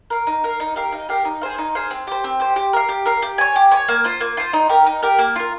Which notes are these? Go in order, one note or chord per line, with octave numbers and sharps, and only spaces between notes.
A#4 F5
D#4
A#4 F5
D#4
G4 A#4 F5
D#4
G4 A#4 F5
D#4
G#4 C5 F5
D#4
G#4 C5 F5
C4
G4 C5
C4
G4 C5
G4
A#4 F5
G4
A#4 F5
G4
C#5 G#5
G4
C#5 G#5
A#3
F4 C5
A#3
F4 C5
D#4
G4 A#4
D#4
G4 A#4
A#3
F4 A#4